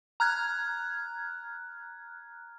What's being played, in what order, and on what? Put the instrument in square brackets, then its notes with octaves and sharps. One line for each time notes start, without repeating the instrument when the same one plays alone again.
[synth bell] A#5 F6 F#6 G#6